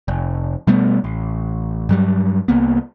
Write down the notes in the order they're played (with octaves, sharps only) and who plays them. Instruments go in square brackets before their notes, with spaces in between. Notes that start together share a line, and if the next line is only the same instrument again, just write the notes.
[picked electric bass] F1
B2 G3 A3 B3
A1
G2 F#3 G3
C2 A#3 B3